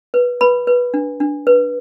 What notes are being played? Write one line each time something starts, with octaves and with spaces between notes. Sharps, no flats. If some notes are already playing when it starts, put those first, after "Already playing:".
B4
B4 B5
B4
D4
D4
B4